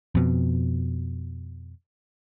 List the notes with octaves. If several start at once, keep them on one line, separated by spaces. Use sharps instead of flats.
F2 B2